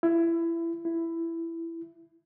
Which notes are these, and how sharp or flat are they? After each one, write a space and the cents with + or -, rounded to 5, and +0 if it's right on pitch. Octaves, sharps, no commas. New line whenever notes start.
E4 +20
E4 +10